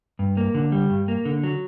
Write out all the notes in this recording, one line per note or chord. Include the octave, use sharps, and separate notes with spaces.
G2
A#3
D3
G3
G2
A#3
D3
F#3